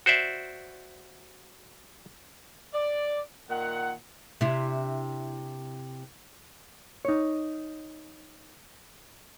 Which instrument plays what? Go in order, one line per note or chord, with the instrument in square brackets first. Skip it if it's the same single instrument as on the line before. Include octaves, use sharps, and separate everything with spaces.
[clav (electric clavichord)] F#4 C5 D5 E5
[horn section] D5
A#2 D#3 F#5
[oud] C3 D4 E4
[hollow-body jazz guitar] D#4 C#5